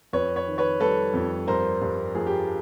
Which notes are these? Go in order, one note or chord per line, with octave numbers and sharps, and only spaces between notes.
F2 B4 C#5
B4 C#5
D#3
B4 C#5
G3 A4 B4
F2
G2 A#4 C5
G2
F3 G#4
G4